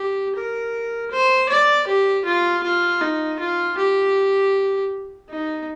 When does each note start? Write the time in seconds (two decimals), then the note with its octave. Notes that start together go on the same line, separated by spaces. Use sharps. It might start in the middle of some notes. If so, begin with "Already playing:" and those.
Already playing: G4
0.36 A#4
1.11 C5
1.49 D5
1.87 G4
2.25 F4
2.63 F4
3.01 D#4
3.39 F4
3.78 G4
5.30 D#4